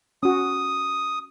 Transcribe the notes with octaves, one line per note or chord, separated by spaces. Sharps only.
C#4 F#4 D#6